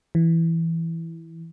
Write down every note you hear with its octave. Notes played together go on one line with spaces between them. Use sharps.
E3